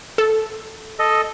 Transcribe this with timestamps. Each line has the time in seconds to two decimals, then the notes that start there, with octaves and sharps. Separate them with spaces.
0.18 A4
0.99 A4 D#5